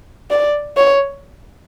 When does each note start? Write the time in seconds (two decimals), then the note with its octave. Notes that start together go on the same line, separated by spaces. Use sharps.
0.31 D5
0.77 C#5